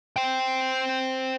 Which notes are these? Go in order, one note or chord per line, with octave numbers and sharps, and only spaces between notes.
C5 G5